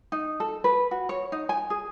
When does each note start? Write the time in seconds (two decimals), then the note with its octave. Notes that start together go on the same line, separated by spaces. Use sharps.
0.12 D#4
0.40 A4
0.64 B4
0.91 F#4
1.09 C#5
1.32 D#4
1.49 G#5
1.70 G#4